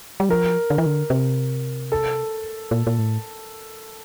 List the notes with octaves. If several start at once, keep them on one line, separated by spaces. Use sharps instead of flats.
G3
F3 A#4
D3
E3
D3
C3
A4
A#2
A#2
A2